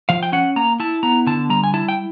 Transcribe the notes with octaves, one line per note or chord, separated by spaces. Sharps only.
F3 F5
G5
C#4 F#5
A#3 A#5
E4 A5
B3 A#5
D3 A5
G3 A#5
G#5
E4 A5
G5